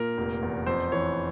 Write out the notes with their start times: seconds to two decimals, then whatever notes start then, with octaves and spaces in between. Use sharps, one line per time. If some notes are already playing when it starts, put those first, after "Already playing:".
Already playing: A#2 A#4
0.18 F1
0.43 E2
0.67 F2 C5
0.92 E3 C#5